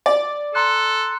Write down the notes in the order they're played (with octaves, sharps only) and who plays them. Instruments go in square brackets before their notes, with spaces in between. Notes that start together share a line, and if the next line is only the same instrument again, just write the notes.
[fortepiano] D5
[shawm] A4 [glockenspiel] A#5 C6 F#6